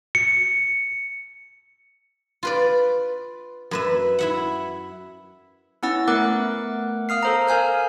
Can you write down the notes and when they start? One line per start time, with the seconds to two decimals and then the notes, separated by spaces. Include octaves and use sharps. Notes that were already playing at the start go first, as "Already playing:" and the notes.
0.15 C#7
2.43 F4 B4 D5
3.71 F#2 B4 E5
4.19 E4 E5 F#5
5.83 B3 C#4 E4 F#5 E6 A6
6.08 A3 B3 A#4 F#5 D6 F#6
7.09 F5 D#6 F6 C7
7.23 A4 C5 A#5
7.47 A#4 F5 G#5 F6 G6